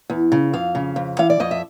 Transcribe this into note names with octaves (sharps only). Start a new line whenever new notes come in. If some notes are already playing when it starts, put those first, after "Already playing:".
E2
C#3
F2 F5
C#3
F2
E3 F5
D5
F2 D#5
E5